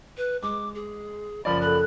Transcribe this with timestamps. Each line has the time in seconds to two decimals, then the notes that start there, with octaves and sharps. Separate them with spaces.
0.18 B4
0.42 G#3 D6
0.75 G#4
1.45 F#1 F3 D5 B5
1.61 A4 B5 F#6